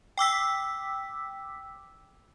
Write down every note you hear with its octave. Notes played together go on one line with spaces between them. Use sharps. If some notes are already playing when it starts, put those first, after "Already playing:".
G5 D6 E6 B6